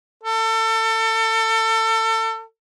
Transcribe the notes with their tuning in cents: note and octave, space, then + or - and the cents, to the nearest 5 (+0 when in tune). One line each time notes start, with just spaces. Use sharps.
A4 +30